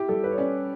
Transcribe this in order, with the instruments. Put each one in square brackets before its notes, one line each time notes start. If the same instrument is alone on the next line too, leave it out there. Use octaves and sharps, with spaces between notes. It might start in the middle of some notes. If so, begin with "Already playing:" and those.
Already playing: [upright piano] E4 [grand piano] G4
[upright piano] G3 [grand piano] A4
[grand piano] B4
C#5
[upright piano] C#4 [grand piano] D5